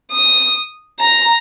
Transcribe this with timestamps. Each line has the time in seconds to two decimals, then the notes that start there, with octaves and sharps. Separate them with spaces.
0.12 D#6
1.00 A#5